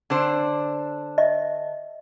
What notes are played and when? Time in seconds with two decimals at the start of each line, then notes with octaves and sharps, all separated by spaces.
0.10 D3 D4 C5
1.18 D#5 E5